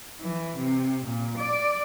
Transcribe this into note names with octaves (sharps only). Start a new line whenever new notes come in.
E3
C3
A#2
D5